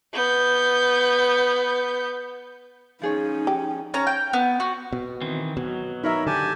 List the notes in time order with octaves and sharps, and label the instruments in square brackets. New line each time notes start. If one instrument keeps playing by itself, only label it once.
[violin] B3 G6
[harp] F3 G#4 C#5 [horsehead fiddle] C#4 D#4
[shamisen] G4
[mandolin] C#4 A#5
G5
B3
F#4
[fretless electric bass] B2
[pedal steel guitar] D#3 E3 C4
[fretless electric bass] B2 [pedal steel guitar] F#3
[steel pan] D#4 E5 [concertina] A#4 C#5 B5
[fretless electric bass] D3 [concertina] G4 G#5 A5